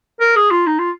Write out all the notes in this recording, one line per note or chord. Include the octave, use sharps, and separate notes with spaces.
A#4
G#4
F4
D#4
F4